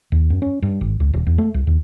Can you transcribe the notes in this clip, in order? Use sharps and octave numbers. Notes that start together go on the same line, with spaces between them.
D#2
F#2
C#4
G2
G#1
C#2
D#1
E2
A3
C2
D#2